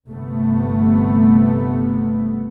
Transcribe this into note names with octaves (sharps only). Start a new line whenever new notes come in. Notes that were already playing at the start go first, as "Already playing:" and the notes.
G1 C3 A3 B3